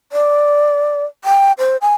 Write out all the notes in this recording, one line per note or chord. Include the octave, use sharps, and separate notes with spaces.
D5
G5
C5
G#5